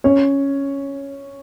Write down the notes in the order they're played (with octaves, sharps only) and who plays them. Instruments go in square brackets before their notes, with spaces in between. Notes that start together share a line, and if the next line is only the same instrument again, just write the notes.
[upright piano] C#4 C#5